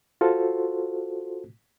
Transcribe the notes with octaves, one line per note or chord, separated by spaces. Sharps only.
F4 F#4 A4 C5